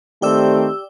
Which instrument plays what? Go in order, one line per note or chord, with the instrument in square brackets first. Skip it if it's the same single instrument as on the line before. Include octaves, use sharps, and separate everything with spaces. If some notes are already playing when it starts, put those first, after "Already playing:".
[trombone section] D#3 C4 [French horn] A3 [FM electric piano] G4 D5 E6